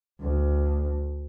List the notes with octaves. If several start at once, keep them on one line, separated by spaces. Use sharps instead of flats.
D2